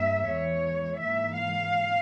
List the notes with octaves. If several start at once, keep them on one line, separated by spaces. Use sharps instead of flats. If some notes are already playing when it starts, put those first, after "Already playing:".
Already playing: G2 A#3 E5
E2 E3 G#3 C#5
G#2 E3 A#3 E5
F5